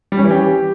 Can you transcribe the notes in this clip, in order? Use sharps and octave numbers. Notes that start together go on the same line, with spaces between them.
G3
C#4
E3
G4